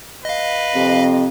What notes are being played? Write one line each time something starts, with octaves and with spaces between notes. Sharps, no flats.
B4 D#5 F5
F2 C3